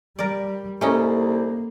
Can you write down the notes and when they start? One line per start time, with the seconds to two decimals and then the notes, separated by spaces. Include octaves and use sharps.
0.19 G3 A#4 D5
0.81 C2 A3 A#3 C#4 D#4